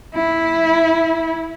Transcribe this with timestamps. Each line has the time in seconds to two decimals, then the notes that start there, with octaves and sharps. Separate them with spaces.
0.15 E4